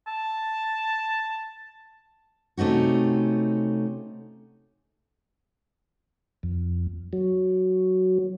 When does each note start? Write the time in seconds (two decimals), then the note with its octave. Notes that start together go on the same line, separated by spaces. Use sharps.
0.07 A5
2.57 C3 A3 C#4 D#4 F#4
6.43 F2
7.13 F#3